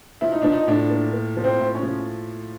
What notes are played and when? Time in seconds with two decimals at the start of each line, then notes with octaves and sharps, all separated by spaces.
0.21 F3 E4
0.32 D#4
0.42 F3 D4
0.52 D#4
0.67 A2 D4
0.90 A#3
1.13 A#3
1.37 F3
1.44 C4
1.59 A2
1.75 C#4
1.83 F3